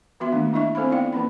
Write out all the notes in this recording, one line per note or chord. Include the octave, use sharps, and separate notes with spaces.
E3 B3 F#4 E5 C6
D#3 A3 A#3 D4
D4 E4 D#5 E5 C#6
C4 A4 C5 F5 B5
B3 D#4 E4 D5 F5 G5
E3 A#3 C#4 B5